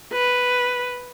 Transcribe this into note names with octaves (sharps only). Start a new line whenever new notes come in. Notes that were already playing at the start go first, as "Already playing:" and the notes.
B4